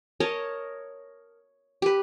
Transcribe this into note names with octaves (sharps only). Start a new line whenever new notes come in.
A#4 C#5 D#5 A5
G4 B4